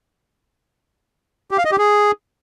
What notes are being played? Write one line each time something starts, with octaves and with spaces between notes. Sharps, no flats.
G4
F5
D#5
G4
G#4